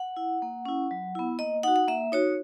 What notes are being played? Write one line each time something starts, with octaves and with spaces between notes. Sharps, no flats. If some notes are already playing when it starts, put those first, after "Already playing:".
Already playing: F#5
E4
A#3
C#4 E4
F#3
B3 E4
A#3 D#5
D#4 F#4 F#5
F#5
A#3 E5
D#4 F#4 C#5